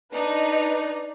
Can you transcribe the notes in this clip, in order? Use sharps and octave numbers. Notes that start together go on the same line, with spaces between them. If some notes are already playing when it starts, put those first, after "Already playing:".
D4 D#4 B4